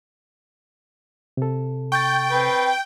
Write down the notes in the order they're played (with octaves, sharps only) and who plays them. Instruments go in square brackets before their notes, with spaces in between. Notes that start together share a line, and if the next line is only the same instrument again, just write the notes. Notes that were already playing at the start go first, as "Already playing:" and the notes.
[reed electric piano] C3 A4
[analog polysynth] G5 [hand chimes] C#6 G6 A6
[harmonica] C4 B4